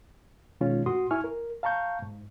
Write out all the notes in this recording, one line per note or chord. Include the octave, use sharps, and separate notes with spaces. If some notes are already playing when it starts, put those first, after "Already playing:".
B2 D#3 G#3 C#4 F4
A2 F#4 C6 D#6
E4 G#5 C#6 F6
A#4
F5 A5 A#5 C#6 G6
G#2